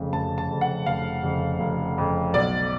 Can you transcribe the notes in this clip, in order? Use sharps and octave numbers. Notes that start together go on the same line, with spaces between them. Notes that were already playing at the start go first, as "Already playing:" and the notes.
Already playing: F1 F2 C#3
F1 A5
A5
F2 C#3
F#5
F1 F5
F2 C#3
F1
F2 C#3
B1 D5